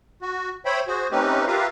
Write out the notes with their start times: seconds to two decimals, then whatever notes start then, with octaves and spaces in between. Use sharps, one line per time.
0.22 F#4
0.65 C5 C#5 E5 G5 B5
0.88 F#4 G#4 C5
1.12 A3 C4 C#4 D#4 G4 B4
1.47 F4 G4 A#4 B4 E5 F5